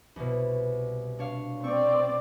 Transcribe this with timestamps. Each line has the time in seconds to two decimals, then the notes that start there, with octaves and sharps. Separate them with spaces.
0.16 C2 B2
1.19 D4 C#5 F5
1.64 C4 D5 C#6